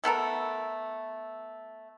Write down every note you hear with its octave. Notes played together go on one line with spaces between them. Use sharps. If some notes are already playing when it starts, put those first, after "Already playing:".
A3 B3 A4 A#4